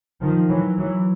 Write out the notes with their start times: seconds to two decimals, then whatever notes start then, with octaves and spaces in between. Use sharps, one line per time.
0.21 D#3 F3
0.49 E3 F#3
0.78 E3 F#3